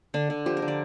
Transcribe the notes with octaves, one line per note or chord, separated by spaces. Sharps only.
D3 D4
D3
F3 G4
A#4
D3
D5